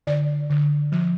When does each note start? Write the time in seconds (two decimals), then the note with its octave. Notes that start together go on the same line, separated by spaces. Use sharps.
0.07 D3 D5
0.50 D3
0.92 F3